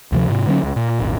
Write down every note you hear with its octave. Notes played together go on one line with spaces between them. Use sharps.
D2 C3 F3
G#2 C3
D3 F#3 G#3 C#4
C#2
A#2
D#1 G#1